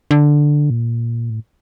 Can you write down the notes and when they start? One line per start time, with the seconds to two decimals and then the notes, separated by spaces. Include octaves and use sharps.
0.11 D3
0.70 A#2
1.30 A2